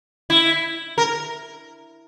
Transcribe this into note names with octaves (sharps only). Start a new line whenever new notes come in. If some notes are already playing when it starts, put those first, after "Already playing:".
E4
A#4